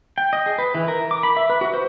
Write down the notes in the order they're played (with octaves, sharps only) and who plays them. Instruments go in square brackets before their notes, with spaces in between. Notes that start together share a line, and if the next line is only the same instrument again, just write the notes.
[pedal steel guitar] G5
D#5
G#4
B4
E3
A#4
D6
B5
E5
B4
F#4
C5